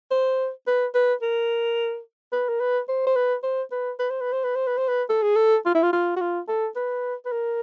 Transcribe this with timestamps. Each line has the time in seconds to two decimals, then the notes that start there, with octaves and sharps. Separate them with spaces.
0.11 C5
0.67 B4
0.95 B4
1.22 A#4
2.32 B4
2.49 A#4
2.60 B4
2.89 C5
3.07 C5
3.16 B4
3.43 C5
3.72 B4
4.00 B4
4.11 C5
4.21 B4
4.33 C5
4.44 B4
4.56 C5
4.67 B4
4.78 C5
4.89 B4
5.10 A4
5.23 G#4
5.36 A4
5.66 F4
5.75 E4
5.83 F4
5.93 F4
6.16 F#4
6.21 F4
6.48 A4
6.76 B4
7.26 B4
7.32 A#4